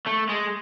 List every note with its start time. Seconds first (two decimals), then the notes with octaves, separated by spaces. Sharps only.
0.07 A3
0.29 G#3